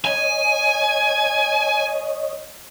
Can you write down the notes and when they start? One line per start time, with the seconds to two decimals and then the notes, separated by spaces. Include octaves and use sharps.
0.05 C#5 D#5 G#5